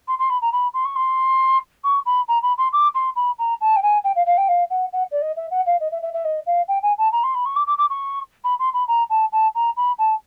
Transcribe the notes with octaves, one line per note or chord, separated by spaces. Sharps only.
C6
C6
B5
A#5
B5
C6
C#6
C6
C#6
B5
A#5
B5
C6
D6
C6
B5
A#5
A5
G5
G#5
G5
F5
F5
G5
F5
F#5
F#5
D5
D#5
E5
F#5
F5
D#5
E5
E5
E5
D#5
F5
G5
G#5
A5
A#5
C6
B5
C#6
D6
D6
D6
C#6
B5
C6
B5
A#5
A5
A5
A#5
B5
A5